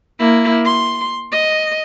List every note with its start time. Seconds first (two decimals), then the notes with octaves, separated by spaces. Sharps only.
0.19 A#3 E4
0.65 C6
1.32 D#5